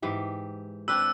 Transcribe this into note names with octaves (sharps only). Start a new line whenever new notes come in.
G#2 E3 G4
C4 D4 B4 E6